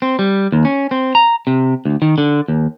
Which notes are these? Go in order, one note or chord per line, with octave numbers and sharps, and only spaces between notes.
C4
G3
D#2
C#4
C4
A#5
C3
D2
D#3
D3
D#2